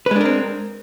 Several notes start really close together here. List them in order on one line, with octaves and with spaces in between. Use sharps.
B4 G#3 D4 A#4 C4